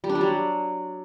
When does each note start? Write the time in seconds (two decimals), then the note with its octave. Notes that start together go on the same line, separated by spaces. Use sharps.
0.04 G3
0.09 D4
0.15 G3
0.21 F#3